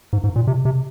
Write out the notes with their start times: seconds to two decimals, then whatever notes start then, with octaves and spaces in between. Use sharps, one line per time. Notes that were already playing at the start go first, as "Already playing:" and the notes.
0.13 G#2
0.24 G#2
0.36 A#2
0.47 C3
0.65 C3